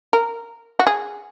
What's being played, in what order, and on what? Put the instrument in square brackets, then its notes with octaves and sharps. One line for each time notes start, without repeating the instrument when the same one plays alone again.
[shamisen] A#4
F#4
G#4